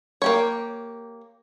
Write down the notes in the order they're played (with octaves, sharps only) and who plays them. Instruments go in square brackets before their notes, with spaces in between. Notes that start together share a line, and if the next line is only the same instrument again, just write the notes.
[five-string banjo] A#3 G4 C#5